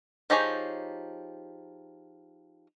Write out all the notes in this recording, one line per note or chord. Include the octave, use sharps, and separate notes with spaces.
F3 D#4 G4 G#4 C#5